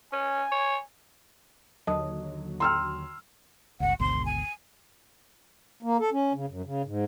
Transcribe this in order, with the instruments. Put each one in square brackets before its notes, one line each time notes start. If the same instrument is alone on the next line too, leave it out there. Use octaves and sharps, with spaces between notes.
[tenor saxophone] C#4 [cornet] G#5
[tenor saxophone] C#5
[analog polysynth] D#2 D3 F#3 [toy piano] D#5 A5 D#6
[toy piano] G5 A#5 [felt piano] C6 E6 F6
[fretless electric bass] G1 C#2 [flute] F#5
[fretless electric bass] G#1 D2 B2 [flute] C6
[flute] G#5
[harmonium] A#3
A4
C#4
C#3
F#2
C#3
G#2